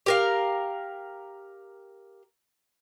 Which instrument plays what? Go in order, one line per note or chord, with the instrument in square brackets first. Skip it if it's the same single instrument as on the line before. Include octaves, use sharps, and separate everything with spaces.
[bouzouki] G4 A#4 F5